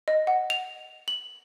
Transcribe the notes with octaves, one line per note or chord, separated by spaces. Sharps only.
D#5
F#5
F7
F#7